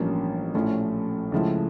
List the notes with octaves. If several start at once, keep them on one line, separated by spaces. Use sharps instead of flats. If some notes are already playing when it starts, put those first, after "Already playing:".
Already playing: A1 G2 F3 A#3 C#4
A#1 A2 F3 A3 C#4
C#2 C#3 F3 A3 E4